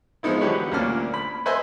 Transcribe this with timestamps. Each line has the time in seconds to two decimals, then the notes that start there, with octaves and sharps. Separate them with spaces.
0.23 F3 G#3 B3 D#4 E4
0.41 D3 E3 F#3 G4 B4 C#5
0.72 D2 A#2 A#3 C#4 D4 F6
1.14 B5
1.46 B4 C5 D#5 E5 G#5 C6